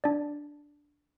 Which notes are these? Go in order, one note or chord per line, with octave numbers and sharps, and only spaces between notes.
D4 D5